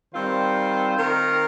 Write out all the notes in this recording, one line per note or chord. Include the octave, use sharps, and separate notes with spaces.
D#3 G3 C4 F4 C5
D#3 C4 F4 A#4